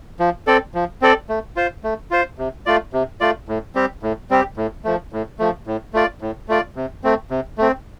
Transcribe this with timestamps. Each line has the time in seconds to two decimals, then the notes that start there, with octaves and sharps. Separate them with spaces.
0.20 F3
0.47 C4 A4 D5
0.74 F3
1.02 C4 A4 D5
1.29 A3
1.56 F4 C5
1.84 A3
2.11 F4 C5
2.38 C3
2.66 A3 F4 D5
2.93 C3
3.21 A3 F4 D5
3.48 A2
3.75 G3 C4 G4
4.03 A2
4.30 G3 C4 G4
4.57 A2
4.84 F3 A3
5.13 A2
5.39 F3 A3
5.67 A2
5.94 A3 F4 D5
6.21 A2
6.48 A3 F4 D5
6.76 C3
7.04 A3 C4
7.30 C3
7.58 A3 C4